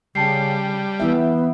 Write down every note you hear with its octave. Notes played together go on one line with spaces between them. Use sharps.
C#3 G3 G5 A5 C7
E3 B3 E4 E5